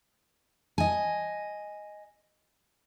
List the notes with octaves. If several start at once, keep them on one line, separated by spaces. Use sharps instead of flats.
D#5 G#5